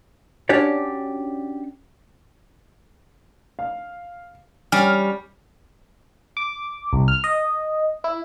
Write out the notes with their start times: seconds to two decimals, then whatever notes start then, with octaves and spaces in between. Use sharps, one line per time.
0.49 C#4 D4 F#4 G4 C#5 D5
3.59 F5
4.72 G3 C#4 G#5 F6
6.37 D6
6.93 C2
7.08 F6
7.24 D#5
8.04 E4